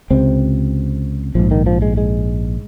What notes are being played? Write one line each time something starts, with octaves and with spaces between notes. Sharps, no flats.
C#2 C3 C4
A#1 G#2 F3
D#3
F3
G#3
G#3